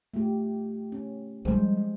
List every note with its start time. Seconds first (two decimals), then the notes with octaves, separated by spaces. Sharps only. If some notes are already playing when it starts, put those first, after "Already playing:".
0.14 A3 F4 G4
0.92 C#4
1.45 F3 G3 G#3 G#4 C5